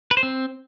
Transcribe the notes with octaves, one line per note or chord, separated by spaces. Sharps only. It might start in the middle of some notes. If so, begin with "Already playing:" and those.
B4
C5
C4